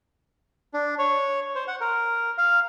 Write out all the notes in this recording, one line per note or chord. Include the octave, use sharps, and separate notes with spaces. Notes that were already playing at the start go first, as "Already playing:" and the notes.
D4
C#5
C5
F#5
A#4
F5